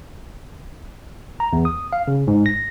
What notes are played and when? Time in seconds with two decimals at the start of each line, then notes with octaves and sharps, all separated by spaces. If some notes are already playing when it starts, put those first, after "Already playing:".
1.40 A#5
1.53 E2
1.65 D#6
1.93 F5
2.08 C#3
2.27 G#2
2.46 A#6